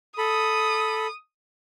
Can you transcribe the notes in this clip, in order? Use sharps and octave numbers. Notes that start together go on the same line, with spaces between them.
A4 B5 D#6